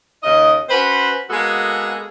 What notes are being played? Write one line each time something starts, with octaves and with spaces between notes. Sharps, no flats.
D#2 C#3 D#5
C#4 F#4 B4 C5
G#3 A#3 B3 F#4 A4